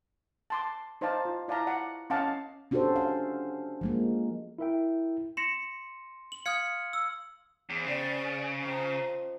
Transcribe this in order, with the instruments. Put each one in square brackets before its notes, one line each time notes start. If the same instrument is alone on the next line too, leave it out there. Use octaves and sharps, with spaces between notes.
[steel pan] A5 C6 D6
D#4 C5 D5 F5 A5
F4
E4 D5 F5 A5 A#5
D5 F#5 D6
C#4 D#5 F5 F#5 A5 D6
[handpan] C#4 D4 F#4 G4 A4 C5
F5
F3 G#3 A#3
[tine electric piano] E4 A#4 E5 G5
[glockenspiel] C6 [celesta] A#6 C#7 E7
[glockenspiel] F#7
[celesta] F5 D#6 [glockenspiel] F6 G#6 C#7
[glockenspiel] E6
[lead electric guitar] E2 [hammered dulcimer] C#3 C5
[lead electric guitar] C#3 [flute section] D5 [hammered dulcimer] G5
[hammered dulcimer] D#3 F3 C4 [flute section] A#5